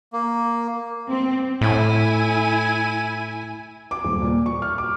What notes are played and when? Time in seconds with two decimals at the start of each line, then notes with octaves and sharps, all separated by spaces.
0.13 A#3
1.09 C4
1.61 A2 E4 G#5
3.91 D6
4.04 D#1
4.22 A#2
4.46 C#6
4.62 F6
4.78 D6